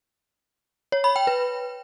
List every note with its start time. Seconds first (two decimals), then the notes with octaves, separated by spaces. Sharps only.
0.92 C#5
1.04 B5
1.16 G5
1.27 B4